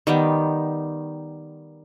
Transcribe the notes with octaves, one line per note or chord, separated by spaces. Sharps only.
D#3 G3 B3